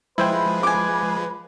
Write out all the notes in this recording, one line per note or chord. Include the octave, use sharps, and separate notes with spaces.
F3 G#3 E4 B4 C5 G5
G#5 D6